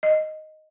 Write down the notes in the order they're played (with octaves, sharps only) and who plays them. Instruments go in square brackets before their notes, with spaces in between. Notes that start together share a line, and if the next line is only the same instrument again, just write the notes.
[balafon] D#5